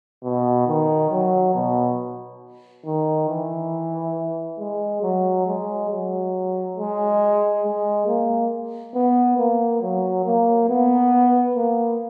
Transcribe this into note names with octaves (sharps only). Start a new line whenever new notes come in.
B2
D#3
F#3
B2
D#3
E3
G#3
F#3
G#3
F#3
G#3
G#3
A#3
B3
A#3
F#3
A#3
B3
A#3